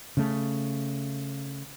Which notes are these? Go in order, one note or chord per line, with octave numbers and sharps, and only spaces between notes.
C#3 A3